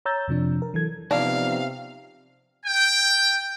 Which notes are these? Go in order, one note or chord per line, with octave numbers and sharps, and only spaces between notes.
C#5 A#5 E6 G6 A6
F2 C3 F3 D4
A#4
E3 F#3 A4 G#6
C3 F3 B3 D4 D#4 F5
G5